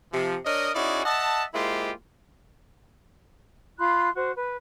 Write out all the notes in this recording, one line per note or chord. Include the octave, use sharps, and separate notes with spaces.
C3 F3
D4 A#4 C#5 D#5
C#4 D#4 E4 F#4 G#4 D5
D#5 E5 F#5 A5
G#3 A#3 E4 F4 G4 C5
F4 B5 C6 F#6
F#4 C5
B4